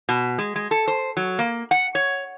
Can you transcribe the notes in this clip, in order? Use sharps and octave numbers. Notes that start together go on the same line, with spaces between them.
B2
G#3
G#3
A4
C5
F#3
A#3
F#5
C#5